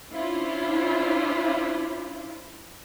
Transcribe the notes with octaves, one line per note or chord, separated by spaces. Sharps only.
C#4 D4 E4 F4 C5